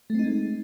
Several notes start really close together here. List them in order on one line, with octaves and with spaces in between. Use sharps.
A3 C4 D#4 G#3